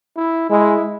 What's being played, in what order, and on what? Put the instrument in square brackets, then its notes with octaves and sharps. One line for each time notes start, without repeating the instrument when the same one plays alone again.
[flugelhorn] E4
[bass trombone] G#3 [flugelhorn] E4